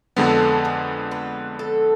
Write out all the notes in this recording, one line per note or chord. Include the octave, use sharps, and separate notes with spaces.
F2 D3 G#3 B3 A4
G#4
B4
A4